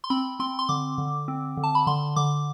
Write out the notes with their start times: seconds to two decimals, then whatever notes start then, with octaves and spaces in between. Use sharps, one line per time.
0.04 C6
0.10 C4 B5
0.40 C4 C6
0.59 C6
0.69 D3 D6
0.98 D3
1.28 C4
1.57 D3
1.63 A5
1.75 B5
1.87 D3 C6
2.16 D3 D6